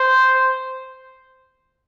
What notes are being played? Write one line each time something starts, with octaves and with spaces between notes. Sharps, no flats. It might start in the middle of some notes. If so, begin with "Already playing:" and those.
Already playing: C5